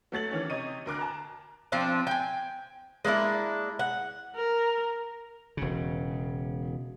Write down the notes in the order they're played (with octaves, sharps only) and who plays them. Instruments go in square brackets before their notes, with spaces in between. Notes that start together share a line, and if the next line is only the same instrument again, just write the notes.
[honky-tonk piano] F#3 A3 A6 F#7
D#3 E3 C#4
C3 C#5 D#5 D#7
D2 A#4 D6 F#6
A5 A#5
[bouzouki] F3 C4 D4
G5 G#5
G#3 A#3 D4 E4
F#5
[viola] A#4
[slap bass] E1 C#3